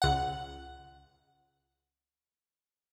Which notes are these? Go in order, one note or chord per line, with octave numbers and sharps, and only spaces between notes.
C#2 F#5